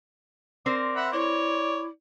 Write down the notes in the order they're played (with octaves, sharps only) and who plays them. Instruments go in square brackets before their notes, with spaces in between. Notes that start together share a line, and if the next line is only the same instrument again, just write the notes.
[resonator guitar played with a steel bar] C4 A#4 C5 [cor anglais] D5
[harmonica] E5 F#5 B5
[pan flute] E4 [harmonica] C#5 [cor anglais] D5